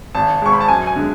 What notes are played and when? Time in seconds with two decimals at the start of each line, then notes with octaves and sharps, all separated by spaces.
0.15 G#1 A5
0.42 G#2 G#3 C#6
0.53 B5
0.60 A5
0.68 F#2 G#5
0.87 G#5
0.96 D3 G#3